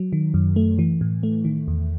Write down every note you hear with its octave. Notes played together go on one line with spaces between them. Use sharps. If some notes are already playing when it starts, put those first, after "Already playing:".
Already playing: F#3
D#3
F#2
A3
E3
A2
A3
D#3
E2